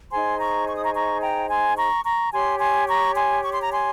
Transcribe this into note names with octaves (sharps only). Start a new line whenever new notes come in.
D#4 G#4 C5 G#5 C6
A#5 C#6
C#6
D#6
A#5 C#6
A#5 C#6
G5 A#5
G#5 C6
A#5 C#6
A#5 C#6
G4 C#5 G#5 C6
G#5 C6
A#5 C#6
G#5 C6
C#6
C6
A#5
G#5 C6